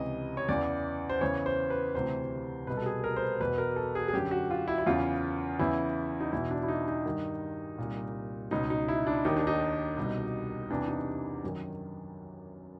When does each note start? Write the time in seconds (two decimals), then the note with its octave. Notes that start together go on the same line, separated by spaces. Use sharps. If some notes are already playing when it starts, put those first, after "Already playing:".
Already playing: C#2 C3 E3 D#5
0.37 C#5
0.48 E2 C#3 E3 D5
1.10 C5
1.21 E2 C#3 E3 C#5
1.46 C5
1.70 B4
1.95 D2 C3 E3 C5
2.67 C2 B2 B4
2.77 A4
2.86 G#4
3.04 A#4
3.16 C5
3.23 B4
3.40 E2 B2 B4
3.58 A#4
3.76 A4
3.95 G#4
4.08 G#4
4.13 F#2 D3 G4
4.31 F#4
4.51 F4
4.68 E4
4.78 E4
4.86 E2 C#3 E3 F4
5.59 E2 C#3 E3 E4
6.21 D#4
6.32 E2 B2 E4
6.51 D4
6.63 E4
6.68 D#4
6.88 D#4
7.05 G2 D#3
7.78 C2 A#2
8.51 C#2 B2 D#4
8.70 D#4
8.88 E4
9.07 D4
9.25 D#2 D#3 D#4
9.36 D4
9.47 D#4
9.97 C2 B2
10.70 E2 C3 E3 D4
10.88 D#4
11.44 F#2 D#3